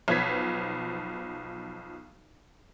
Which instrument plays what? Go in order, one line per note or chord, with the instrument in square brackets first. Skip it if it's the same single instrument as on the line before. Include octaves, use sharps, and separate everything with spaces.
[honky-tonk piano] B1 F3 B4 G#6 B6